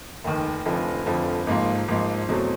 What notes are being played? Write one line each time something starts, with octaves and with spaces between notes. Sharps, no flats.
F1 D#2 D#3
F1 F2 D3 F3
F1 F2 D3 F3
G#1 G#2 F3 A#3
G#1 G#2 F3 A#3
E2 B2 F#3 A3 C4